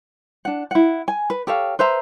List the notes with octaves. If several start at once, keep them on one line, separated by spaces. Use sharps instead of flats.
D4 F#5
E4 F#5
G#5
B4
G4 A4 C#5 F5
B4 C5 E5 A#5